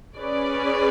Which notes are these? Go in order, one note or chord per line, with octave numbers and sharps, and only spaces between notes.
C#4 G#4 B4 D5